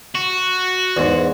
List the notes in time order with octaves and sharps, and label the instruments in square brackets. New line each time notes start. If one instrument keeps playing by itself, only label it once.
[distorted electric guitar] F#4
[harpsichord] E2 G#2